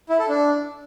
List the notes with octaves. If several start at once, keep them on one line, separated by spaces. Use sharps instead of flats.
E4
A4
D4